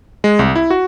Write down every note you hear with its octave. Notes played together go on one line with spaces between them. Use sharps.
G#3
C2
E4
F#4